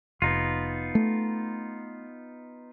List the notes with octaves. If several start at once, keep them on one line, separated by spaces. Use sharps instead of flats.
F1 B3 D#4 F4
A3